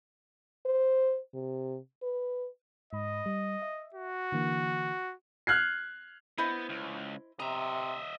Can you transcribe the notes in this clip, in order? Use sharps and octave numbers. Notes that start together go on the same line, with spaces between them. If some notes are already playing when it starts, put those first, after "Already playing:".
C5
C3
B4
G#2 D#5 B5
G3
E5
F#4
D3 E3 A#3
F6 F#6 G#6 C7
B3 E4 C5 D#5
C#2
C3 D#5 E5 A#5